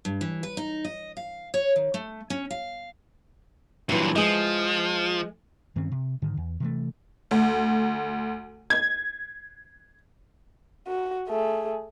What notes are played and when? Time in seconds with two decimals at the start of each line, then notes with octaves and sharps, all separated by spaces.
0.05 G2
0.21 E3
0.43 B4
0.57 D#4
0.84 D#5
1.17 F5
1.54 C#5
1.76 D#3
1.94 A3
2.30 C#4
2.50 F5
3.89 G2 A#2 E3 F#3
4.16 F3 G#3 G#4
5.76 G2 D#3 C4 C#4
5.92 C3
6.22 G#2 D3 D#3
6.37 E2
6.60 C3 E3 A3
7.31 D2
8.70 G#6
10.87 F#4
11.28 A3 G#4